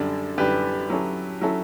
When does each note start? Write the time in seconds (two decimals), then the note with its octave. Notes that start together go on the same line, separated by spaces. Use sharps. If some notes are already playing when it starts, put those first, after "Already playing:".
Already playing: F#2 D3 G3 D4 A4
0.38 F#2 D3 G3 D4 G4 B4
0.90 F#3 C#4 E4 A4
1.41 F#3 C#4 E4 A4